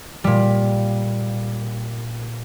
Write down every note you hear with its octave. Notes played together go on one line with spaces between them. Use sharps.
A#2 G3